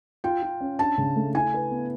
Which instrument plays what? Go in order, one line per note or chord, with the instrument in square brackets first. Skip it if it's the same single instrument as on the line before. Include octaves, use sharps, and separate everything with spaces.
[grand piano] F4 [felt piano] G5
[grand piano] F4
C#4
[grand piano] D4 [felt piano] A5
[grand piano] C#3
A3
[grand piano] E4 [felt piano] G#5
[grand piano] B4
B3